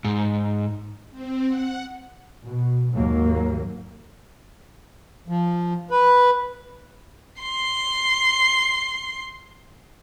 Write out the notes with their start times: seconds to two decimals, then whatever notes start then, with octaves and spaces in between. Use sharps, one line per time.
0.05 G#2
1.11 C4
1.46 F#5
2.47 B2
2.95 D#2 G#2 F#3 A#3
5.28 F3
5.90 B4
7.42 C6 C7